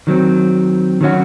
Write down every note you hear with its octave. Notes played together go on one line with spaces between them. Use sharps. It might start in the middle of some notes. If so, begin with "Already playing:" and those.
D#3 F#3 C4
D#3 F#3 C#4 F#4